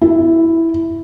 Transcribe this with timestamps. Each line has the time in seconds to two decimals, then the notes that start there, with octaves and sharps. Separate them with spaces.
0.01 E4